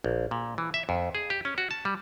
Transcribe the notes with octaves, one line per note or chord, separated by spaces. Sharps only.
A#1
A#2
E3
E5
F2
G#4
G4
C#4
F#4
A5
G3